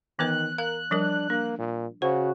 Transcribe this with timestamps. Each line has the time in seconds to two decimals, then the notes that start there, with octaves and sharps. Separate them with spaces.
0.19 D#3 E3 B3 B4 F#6
0.58 A#4 F5 F#6
0.91 F3 G3 D4 A#4
1.30 A#3 D4
1.59 A#2
2.02 C#3 F#4 C5